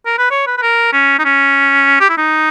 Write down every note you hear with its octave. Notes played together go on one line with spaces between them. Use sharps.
A#4
B4
C#5
B4
B4
A#4
C#4
D#4
C#4
G4
E4
D#4